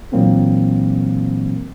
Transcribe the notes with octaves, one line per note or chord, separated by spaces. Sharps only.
A#2 E3 F#3 A#3 C4 D4